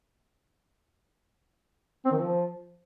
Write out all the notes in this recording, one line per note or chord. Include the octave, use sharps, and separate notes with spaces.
C4
D#3
F3